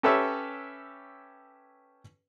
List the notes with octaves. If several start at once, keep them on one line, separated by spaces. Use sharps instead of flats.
C#4 G4 A4 B4 C#5 E5